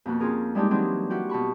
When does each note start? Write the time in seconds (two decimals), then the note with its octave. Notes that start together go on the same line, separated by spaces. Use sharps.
0.06 F2 B2 A#3 F#4
0.20 C4 C#4 F4 G#4 A#4
0.55 G3 G#3 D4 D#4 G4
0.71 E3 F#3 C4 D4 D#4
1.10 E4 F#4 G4
1.30 B2 A5 B5 C#6